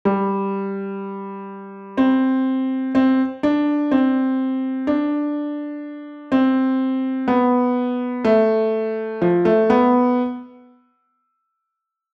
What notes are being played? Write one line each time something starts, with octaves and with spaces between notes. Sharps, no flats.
G3
C4
C4
D4
C4
D4
C4
B3
A3
F3
A3
B3